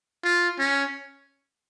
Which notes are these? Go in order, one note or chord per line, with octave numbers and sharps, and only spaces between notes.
F4
C#4